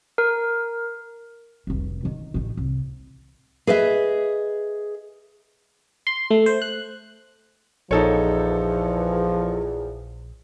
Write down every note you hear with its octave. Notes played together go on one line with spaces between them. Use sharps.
A#4
F1 C2
D3 D#3
A1 D#3
C2
G#4 B4 D#5 E5
C6
A3
C5
F#6
A#1 E2 F3 D#4 A4 C#5